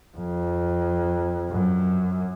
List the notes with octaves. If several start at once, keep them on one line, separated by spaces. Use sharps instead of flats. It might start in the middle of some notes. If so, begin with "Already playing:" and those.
F2
F#2